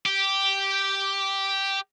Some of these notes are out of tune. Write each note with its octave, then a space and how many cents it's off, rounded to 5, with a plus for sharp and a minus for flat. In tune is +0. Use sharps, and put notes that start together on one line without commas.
G4 -5